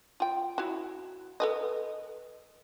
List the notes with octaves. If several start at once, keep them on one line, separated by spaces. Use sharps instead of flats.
F4 G5
E4 F#4
A4 B4 D#5